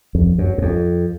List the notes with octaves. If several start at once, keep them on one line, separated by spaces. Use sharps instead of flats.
F2
F#2
F#2
F2